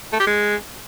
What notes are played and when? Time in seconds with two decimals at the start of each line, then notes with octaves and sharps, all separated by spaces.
0.13 A3
0.20 G4
0.27 G#3